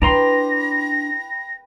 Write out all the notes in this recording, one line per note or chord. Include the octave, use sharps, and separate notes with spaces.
D4 E4 B4 G5 A#5 C6 A#6